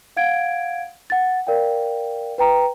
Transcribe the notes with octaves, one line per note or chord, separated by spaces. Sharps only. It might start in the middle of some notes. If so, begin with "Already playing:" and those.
F5 F#5 G#6 D7
F#5 A6
A#4 D5 F5 G5
B4 G5 A#5